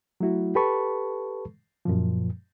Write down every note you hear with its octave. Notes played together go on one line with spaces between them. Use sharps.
F#3 A3 E4 F#4
G4 A4 B4 A5 B5 C#6
F#2 A#2 F3